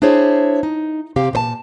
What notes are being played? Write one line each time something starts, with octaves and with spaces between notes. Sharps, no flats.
D4 E4 G#4 C5 C#5
D#4
C3 C4 G4 F5
A#2 C5 A5